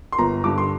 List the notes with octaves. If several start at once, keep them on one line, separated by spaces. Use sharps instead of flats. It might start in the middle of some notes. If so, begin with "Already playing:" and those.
C6
G1 A#5
G2 D3 D6
C6